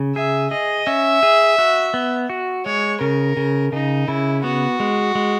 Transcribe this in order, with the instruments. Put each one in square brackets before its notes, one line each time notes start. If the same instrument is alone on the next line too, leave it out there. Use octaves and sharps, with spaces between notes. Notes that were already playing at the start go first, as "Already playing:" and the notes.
Already playing: [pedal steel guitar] C#3
[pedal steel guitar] G#4 [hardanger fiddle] E5
[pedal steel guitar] G#4 [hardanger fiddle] D#5
[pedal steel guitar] C#4 [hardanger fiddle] E5
[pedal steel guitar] G#4
F#4
B3
F#4
[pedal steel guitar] G#3 [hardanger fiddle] C#5
[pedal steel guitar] C#3 [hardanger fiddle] A#4
[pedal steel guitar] C#3
[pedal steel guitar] C#3 [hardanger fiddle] D#4
[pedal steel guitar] C#3 [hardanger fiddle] E4
[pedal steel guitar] B3 [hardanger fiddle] F#4
[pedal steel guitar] G#3
G#3